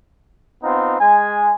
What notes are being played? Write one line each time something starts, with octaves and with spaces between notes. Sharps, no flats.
B3 C4 D#4 F4
G#3 G#5